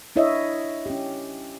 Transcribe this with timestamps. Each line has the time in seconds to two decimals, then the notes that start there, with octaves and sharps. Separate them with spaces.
0.16 D4 E4 C#5 D#5 E5
0.86 C#4 G4